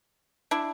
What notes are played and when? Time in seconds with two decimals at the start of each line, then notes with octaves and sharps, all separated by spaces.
0.51 D4 E4